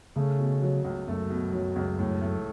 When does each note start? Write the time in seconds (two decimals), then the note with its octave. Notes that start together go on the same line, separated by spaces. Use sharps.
0.16 C#3 A3
0.39 B2
0.62 F#3
0.84 C#2
1.07 F#2 A3
1.30 B2
1.53 F#3
1.76 C#2
1.99 A2
2.21 A3